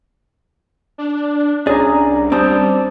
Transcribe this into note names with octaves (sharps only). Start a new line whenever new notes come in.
D4
C2 C#4 D4 G#4 D5 A#5
G3 C4 D5 A5 D#6